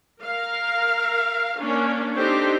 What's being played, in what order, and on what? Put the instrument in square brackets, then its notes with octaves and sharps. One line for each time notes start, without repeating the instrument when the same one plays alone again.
[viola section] A#4 F5
A#3 C#4 D4
C4 D4 D#4 G4 A4 C5